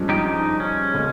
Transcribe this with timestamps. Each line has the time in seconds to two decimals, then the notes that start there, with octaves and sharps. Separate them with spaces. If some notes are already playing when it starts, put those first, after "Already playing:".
Already playing: G2 F3 G#3 C#4
0.09 D#4 G4
0.26 D#4
0.60 C#4
0.94 C#3 G#3